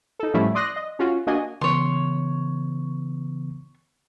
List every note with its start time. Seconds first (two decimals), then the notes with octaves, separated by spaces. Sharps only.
0.19 D#4 A4
0.34 A2 F3 G3 A3 C#4 E4
0.55 D5 C6 D#6 F#6 A#6
0.76 D#5
0.99 C#4 F4 F#4
1.27 A#3 D4 F#4 D#5 G#5
1.61 C#3 E3 B3 C#5 C6